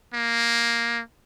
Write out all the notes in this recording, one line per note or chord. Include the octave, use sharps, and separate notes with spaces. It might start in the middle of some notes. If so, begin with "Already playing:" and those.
A#3